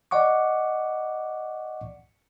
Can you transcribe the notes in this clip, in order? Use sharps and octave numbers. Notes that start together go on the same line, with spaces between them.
D5 D#5 F#5 C#6 D6